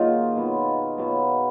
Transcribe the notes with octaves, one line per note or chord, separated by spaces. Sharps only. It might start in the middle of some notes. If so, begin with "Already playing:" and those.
Already playing: D#3 F#3 A#3 D#4 F4 G#4
B2 F#3 B3
B2 F#3 B3